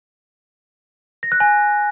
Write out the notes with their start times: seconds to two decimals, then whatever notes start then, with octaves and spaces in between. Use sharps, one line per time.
1.23 A#6
1.32 F#6
1.40 G#5